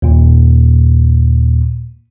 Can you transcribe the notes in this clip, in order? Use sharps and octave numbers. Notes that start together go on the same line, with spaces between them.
D#2 A#2